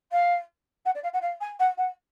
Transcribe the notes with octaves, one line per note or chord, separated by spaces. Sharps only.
F5
F#5
D5
F5
F#5
F5
G#5
F#5
F#5